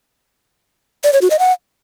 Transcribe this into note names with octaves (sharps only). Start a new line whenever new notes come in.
D5
C#5
F#4
D#5
F#5